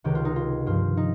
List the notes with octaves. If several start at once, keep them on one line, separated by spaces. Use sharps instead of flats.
C#2 C3 D#3 G4
F4
D#4
F4
G2 F3 F4
D#4